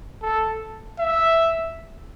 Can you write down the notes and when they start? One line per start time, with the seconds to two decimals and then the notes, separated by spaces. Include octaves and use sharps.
0.22 A4
0.99 E5